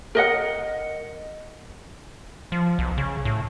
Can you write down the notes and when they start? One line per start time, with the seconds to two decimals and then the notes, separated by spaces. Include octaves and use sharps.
0.15 A#4 D#5 F#5
2.52 F3
2.79 B1
2.98 C#3
3.25 A2